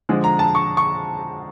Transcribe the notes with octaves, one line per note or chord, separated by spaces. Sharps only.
D3 F3 G#3
A#5
A5
C#6
C#6